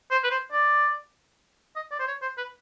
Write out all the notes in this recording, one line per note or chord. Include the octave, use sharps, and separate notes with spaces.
C5
B4
C5
D5
D#5
D5
C5
C#5
C5
B4